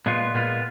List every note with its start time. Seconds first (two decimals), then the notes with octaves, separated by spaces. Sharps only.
0.06 A#2 G#3 B3 F4
0.35 A#2 G#3 B3 F4